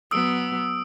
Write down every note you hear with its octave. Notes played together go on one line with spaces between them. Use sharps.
F#3 B3 D#6 E6 D7